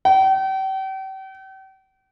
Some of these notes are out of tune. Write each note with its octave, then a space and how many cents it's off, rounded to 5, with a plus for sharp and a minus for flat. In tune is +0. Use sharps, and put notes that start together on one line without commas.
G5 -40